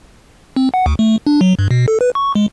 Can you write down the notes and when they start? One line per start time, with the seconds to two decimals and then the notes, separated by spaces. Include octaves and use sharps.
0.56 C4
0.74 F#5
0.86 D2
0.99 A3
1.27 D4
1.41 F#3
1.59 G2
1.71 B2
1.88 A4
2.01 B4
2.15 C#6
2.35 G#3